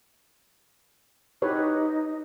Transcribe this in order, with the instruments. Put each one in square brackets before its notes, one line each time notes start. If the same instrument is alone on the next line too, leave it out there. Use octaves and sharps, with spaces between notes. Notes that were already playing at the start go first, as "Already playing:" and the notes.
[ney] D#4 [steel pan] G4 B4 C#5